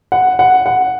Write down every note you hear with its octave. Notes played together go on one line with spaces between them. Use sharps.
F#5
F#5
F#5